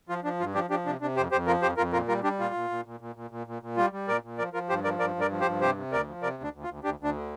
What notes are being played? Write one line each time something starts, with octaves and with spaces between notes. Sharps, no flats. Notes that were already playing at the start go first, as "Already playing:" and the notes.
F3 F4
F3 D4
G2 F4
F3 D4 G4
F3 D4 G4
C3 D4
C3 D4
F2 G4 C5
F2 G4 C5
F3 F4 A#4
F2 G4 C5
F2 F4 A#4
A#2 F4 A#4
G3 F4 A#4
G3 D4 G4
A#2 F4
A#2
A#2
A#2
A#2
A#2
A#2
A#2
A#2
G3 F4
G3
A#2 A#4 D5
A#2
F3 A#4 D5
F3 F4 A#4
G2 G4 C5
F3 A#4 D5
G2 A#4 D5
G2
A#4 D5
F3
G4 C5
G2
C3 G4 C5
C3
D2 A#4 D5
F3
C3 A#4 D5
D2
D4
D2
F4
D2
D2 D4 G4
D2 D4
D3